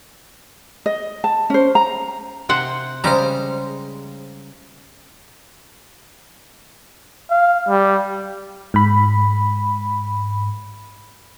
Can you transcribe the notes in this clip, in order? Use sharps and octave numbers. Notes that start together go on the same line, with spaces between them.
D#5
A5
C#4 C5
A#5
C3 C5 F#5
C#3 G3 G#3 C5 A#5
F5
G3
G#2 B5